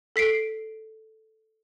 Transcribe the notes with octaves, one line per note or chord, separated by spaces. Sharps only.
A4 B6 C7 D7